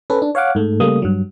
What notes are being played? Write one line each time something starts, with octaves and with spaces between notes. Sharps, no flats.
C#4 A4 B4
D4
C#5 F5 F#5 D6
G#2 A3
C#3 G3 A3 A#3 D#6
G2 F#3